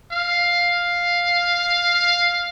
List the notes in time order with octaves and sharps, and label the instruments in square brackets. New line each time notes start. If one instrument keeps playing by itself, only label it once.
[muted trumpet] F5